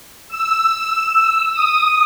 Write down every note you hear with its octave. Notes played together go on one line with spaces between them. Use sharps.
E6
D#6